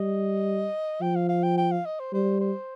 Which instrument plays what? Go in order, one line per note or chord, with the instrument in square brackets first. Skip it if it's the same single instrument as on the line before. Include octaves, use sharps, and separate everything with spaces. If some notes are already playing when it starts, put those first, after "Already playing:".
Already playing: [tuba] G3 [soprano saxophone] D#5
[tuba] F3 [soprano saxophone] G5
[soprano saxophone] F5
F5
G5
G5
F5
D#5
C5
[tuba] G3 [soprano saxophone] C5
[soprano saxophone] C5